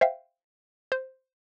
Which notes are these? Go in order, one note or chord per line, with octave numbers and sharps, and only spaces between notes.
C5 E5 F5 G5
C5